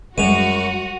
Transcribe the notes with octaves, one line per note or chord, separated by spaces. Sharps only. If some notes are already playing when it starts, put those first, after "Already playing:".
F#2 G3 G#3 F#4 D#7 F7